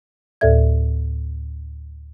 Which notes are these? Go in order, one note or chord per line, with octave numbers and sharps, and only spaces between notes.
D2 A2 A4 D5 E5 G#6